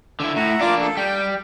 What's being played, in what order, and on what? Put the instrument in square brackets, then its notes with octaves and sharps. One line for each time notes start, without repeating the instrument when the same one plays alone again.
[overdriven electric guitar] D3 E4 [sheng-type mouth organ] E6
[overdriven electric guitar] A2 [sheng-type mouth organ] E5 F#5 A#5
[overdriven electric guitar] A#3 D4 [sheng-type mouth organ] F4 D5 D6
[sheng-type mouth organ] A4
[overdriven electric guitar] G3 [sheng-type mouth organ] G5